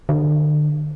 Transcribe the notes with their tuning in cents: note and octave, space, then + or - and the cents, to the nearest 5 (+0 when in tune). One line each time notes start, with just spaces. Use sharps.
D3 +35